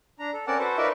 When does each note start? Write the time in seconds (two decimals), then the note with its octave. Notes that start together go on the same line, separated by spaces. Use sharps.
0.19 D4 A#5
0.33 A4
0.47 C4 C#4 A#4 D5 F#5 A5
0.59 F#4 A4 B4 C5
0.77 D#4 F4 A#4 B4 D5 E5